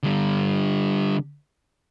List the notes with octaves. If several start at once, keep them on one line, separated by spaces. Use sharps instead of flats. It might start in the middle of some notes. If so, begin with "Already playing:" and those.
D3 G3